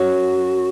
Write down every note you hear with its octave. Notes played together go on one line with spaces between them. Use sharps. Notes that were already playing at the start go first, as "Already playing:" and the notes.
Already playing: F#2 F#3 C#4 F#4